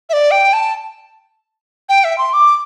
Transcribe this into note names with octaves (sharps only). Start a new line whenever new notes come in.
E5
D5
G5
A5
G5
E5
C6
D6